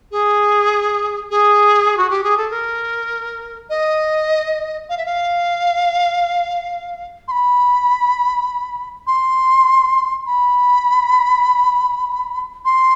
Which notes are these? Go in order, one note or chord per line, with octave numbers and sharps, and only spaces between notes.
G#4
G#4
F#4
G4
G#4
A4
A#4
D#5
F5
E5
F5
C6
B5
C6
B5
C6